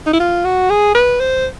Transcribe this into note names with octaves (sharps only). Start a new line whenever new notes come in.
D#4
E4
F4
F#4
G#4
B4
C5